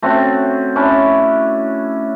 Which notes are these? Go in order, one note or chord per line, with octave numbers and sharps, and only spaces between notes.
A3 C4 C#4 F#4
C#4 D4 E4